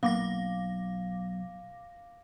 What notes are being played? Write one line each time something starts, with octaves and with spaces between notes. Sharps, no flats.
B1 A#3 B3 F5 D6 A#6